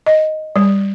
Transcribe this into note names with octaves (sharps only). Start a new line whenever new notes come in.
D#5
G3